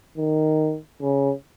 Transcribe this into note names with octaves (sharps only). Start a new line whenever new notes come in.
D#3
C#3